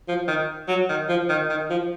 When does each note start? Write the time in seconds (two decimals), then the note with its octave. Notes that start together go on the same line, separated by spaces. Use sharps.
0.08 F3
0.28 D#3
0.68 F#3
0.89 D#3
1.09 F3
1.29 D#3
1.50 D#3
1.70 F3